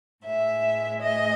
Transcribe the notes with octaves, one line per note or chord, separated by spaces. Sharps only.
A2 E5
G#3
D#5